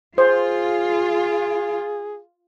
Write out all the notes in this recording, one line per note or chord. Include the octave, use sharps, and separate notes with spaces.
F4 G#4 C5